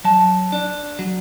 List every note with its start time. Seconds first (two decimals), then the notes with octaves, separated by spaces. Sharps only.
0.04 F#3 A5
0.52 D4
0.99 F#3